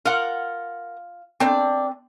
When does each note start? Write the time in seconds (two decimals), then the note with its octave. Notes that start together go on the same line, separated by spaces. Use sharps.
0.05 F4 A#4 F#5
1.40 D#3 A3 C4 D4